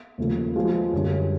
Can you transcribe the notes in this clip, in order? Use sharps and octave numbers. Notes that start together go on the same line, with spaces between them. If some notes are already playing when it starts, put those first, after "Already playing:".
D#2 C#3 F3 A3
F3 G#3 B3
F#2 D3 G3 B3